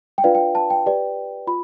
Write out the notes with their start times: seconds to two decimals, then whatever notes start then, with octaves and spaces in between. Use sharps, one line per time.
0.18 G5
0.24 D4 F4 B4 D5 F5
0.35 G5
0.55 A5
0.70 G5
0.86 G4 B4 D5
1.47 F4 B5